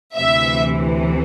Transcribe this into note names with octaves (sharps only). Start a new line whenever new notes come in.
D2 C3 E3 E5